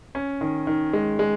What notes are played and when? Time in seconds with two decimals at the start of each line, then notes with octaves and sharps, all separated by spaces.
0.15 C#4
0.41 D#3
0.67 D#3
0.93 G#3
1.19 G#3